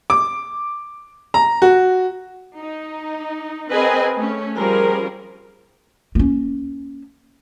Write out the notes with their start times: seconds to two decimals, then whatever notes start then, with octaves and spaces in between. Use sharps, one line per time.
0.10 D6
1.34 A#5
1.62 F#4
2.56 D#4
3.71 C4 G#4 A#4 B4 D#5 G#5
4.15 A3 C#4
4.56 F3 G3 C#4 G#4 A#4
6.15 A#3 C#4